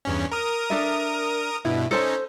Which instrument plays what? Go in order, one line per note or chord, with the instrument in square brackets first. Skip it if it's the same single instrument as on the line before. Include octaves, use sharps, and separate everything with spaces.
[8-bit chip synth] E2 G2 C#4
A#4 D#6
[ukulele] D4 A4 E5
[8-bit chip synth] G2 B2 [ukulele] E4
[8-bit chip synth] C#4 D#4 [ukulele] A4 C5 A5